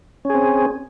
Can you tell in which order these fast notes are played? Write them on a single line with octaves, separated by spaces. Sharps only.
C#4 G#4 C4